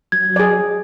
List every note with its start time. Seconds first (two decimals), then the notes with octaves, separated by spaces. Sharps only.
0.12 F#3 G#6
0.36 G#4 D5